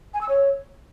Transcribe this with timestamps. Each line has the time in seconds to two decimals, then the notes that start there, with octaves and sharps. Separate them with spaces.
0.14 G#5
0.21 E6
0.29 C#5